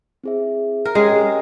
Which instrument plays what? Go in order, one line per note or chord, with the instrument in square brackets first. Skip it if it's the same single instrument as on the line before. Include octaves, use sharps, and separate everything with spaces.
[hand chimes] C4 E4 G#4 C5 E5
[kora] A#4
[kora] G#3 G#4 [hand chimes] C#4 G4 C#5 G5